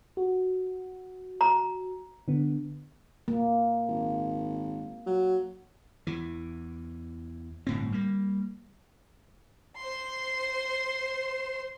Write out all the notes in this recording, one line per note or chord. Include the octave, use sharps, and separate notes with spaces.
F#4
A#5
D3 B3
A#3
G#1
F#3
E2 E3
G1 A2 C4
G3 A#3
C5 C6